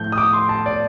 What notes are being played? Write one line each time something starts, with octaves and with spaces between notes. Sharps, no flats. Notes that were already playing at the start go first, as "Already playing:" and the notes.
Already playing: A2 F3 A3 G6
D#6
D6
C6
A5
D5